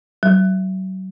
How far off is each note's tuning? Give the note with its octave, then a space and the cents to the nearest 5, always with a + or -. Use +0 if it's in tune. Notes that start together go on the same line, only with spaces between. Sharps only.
F#3 +35